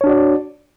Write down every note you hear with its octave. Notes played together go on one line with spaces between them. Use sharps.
D4 F#4 C#5 D5